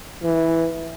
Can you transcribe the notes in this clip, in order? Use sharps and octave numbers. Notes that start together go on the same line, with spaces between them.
E3